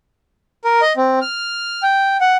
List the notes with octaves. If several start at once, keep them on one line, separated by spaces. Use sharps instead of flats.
A#4
D#5
C4
F6
G5
F#5